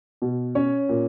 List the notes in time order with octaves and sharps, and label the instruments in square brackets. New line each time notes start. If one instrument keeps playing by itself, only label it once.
[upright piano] B2
C#4 C#5
A#2